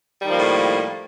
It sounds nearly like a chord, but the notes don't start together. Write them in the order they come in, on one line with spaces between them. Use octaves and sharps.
G3 D#3 F3 A#3 A2